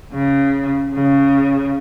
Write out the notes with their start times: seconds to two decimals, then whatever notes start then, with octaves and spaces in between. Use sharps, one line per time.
0.12 C#3
0.93 C#3